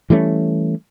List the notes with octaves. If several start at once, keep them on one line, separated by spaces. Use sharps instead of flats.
E3 G3 A3 C#4